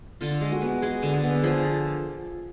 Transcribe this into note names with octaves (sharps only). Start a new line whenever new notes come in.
D3 F4
G#3
F#4
B3
G#3 G#4
D3
G#4
B3
F3 G#4